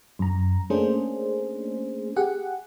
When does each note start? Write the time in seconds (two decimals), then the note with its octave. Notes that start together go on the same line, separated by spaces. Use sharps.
0.19 F#2 A#5
0.70 A3 A#3 C#4 D4 G#4 C5
2.16 G4 G#4 F#5